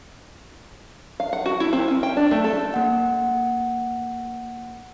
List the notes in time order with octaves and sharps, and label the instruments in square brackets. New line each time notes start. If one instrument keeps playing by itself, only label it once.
[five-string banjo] F5
F#5
F#4
E4
C4
C#4
G5
D4
A3
A4
[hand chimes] A#3 F#5